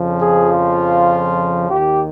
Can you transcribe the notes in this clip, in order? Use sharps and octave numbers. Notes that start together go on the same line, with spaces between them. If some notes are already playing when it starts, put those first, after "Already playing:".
Already playing: F2 C#3 F3
G#4
F4
D#2 D#3 G4